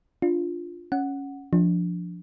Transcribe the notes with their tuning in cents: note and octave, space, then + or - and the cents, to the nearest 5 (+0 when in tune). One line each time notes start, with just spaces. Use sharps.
D4 +0 F4 +0
C#4 +0 F#5 +0
F3 +0 D4 -5